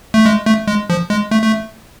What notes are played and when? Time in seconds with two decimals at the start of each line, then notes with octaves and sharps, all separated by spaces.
0.14 A3
0.26 G#3
0.46 A3
0.67 G#3
0.90 F3
1.10 G#3
1.31 A3
1.42 A3